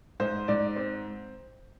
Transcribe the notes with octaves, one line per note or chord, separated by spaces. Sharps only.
G#2 C5
G#2 D5
C4